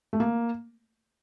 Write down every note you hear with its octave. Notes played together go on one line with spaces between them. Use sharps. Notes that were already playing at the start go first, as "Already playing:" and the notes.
A3
A#3